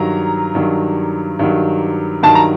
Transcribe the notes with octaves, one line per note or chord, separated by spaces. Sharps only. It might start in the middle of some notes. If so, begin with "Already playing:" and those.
Already playing: G2 D#3 F#3 A#5
G2 D#3 F#3
G2 D#3 F#3
G2 D#3 F#3 A5
A#5